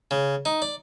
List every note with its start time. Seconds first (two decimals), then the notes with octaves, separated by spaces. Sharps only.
0.11 C#3
0.45 D#4
0.62 D5